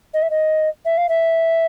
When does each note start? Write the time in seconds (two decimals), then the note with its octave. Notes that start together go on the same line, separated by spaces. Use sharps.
0.14 D#5
0.22 E5
0.30 D#5
0.85 E5
0.97 F5
1.09 E5